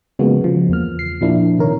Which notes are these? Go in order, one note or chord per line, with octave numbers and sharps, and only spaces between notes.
C#3 F3 G#3 A#3 B3 F#4
C#3 F3
E2 A#3 F6
C7
A#2 F3 A#3 D4 E4
C3 D#3 A#4 C#5